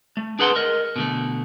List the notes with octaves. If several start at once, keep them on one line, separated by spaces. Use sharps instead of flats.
A3
D4 G#4 B4 F#5 B5 C6
A#4 D#5
B2 D3 A3